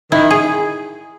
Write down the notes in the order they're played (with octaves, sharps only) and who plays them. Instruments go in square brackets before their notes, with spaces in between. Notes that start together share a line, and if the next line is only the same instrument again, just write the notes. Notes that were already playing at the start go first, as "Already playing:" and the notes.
[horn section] D#3 [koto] E4
[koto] G#4